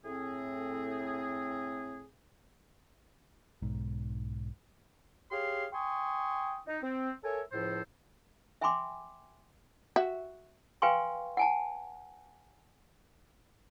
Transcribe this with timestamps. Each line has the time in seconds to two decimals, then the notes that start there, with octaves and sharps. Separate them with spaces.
0.05 A2 C4 G#4
3.62 B1 G#2
5.31 G4 G#4 C#5 F5 C6
5.73 G5 G#5 C6 C#6 D#6
6.68 D#4
6.82 C4
7.24 A4 A#4 C#5 E5 G#5
7.53 C#2 A2 F3 A4 C5
8.61 E5 G5 G#5 B5 C6 D6
9.96 F#4 E5
10.82 B4 F5 G5 G#5 C6 C#6
11.37 F#5 G#5 A5